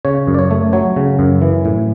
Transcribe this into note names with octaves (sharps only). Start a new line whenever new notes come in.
C#3 C#5
F#2
D5
C#5
A3
F#3 C#5
C#3
F#2
E3
A2